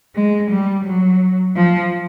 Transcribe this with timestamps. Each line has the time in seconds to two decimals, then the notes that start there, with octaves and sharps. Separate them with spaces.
0.15 G#3
0.51 G3
0.85 F#3
1.56 F3